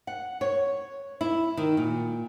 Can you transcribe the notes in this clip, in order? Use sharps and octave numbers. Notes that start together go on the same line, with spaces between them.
F#5
C#5
E4
D#3
A#2